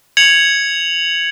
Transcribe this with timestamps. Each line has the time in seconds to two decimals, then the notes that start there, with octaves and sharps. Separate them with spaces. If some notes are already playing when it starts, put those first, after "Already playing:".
0.17 G#6 C#7 F7 F#7